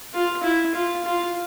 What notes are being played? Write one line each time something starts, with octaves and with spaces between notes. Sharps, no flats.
F4
E4
F4
F4